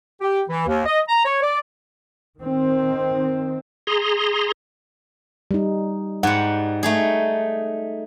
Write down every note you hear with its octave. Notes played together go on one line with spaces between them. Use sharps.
G4
E3
D#2
D#5
A#5
C#5
D5
D#3 C4
G#4 A#5 C6
G3 D#4
G#2 G3 F#5
A3 D#4 G#4